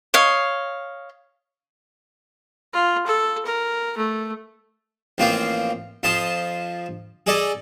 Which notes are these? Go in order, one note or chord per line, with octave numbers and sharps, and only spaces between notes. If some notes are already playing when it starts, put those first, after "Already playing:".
C#5 D#5 F5
F4
A4
A#4
A3
A1 F3 A#3 C4 F4
F2 F3 A5 C6 D#6
G#4 A4 D5 D#5